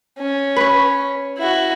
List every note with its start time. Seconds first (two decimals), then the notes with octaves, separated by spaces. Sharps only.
0.18 C#4
0.56 B4 C#5
1.38 E4 F#4